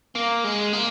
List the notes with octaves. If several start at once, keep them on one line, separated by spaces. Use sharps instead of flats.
A#3
G#3
A#3